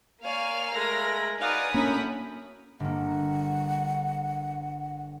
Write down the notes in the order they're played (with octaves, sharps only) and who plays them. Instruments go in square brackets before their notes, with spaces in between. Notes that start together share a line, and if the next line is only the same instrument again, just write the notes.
[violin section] A#3 F5 F6 [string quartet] C#5 D5 G#5
[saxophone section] G#3 A3 [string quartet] A#4 B5 A#6
[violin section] D#4 B4 D5 [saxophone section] F#4 F5 [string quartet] G#5 D#6
[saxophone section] F#2 A2 [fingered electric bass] A#3 C#4 D4 [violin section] A#4 C#5 B5
[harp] G1 A#3 [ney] F#5